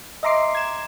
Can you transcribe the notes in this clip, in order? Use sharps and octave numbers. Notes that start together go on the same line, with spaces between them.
D#5 E5 A#5 C6 D6 C7
G#6 E7